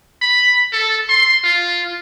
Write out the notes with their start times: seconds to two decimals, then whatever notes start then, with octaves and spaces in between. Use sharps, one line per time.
0.22 B5
0.72 A4
1.09 C6
1.44 F4